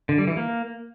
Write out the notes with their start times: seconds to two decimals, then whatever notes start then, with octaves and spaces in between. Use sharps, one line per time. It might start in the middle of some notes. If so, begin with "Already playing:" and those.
0.09 D3
0.18 G3
0.28 E3
0.37 A#3